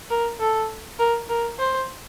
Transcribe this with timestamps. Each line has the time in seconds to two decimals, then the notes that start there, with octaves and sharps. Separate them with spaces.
0.10 A#4
0.40 A4
0.99 A#4
1.29 A#4
1.58 C5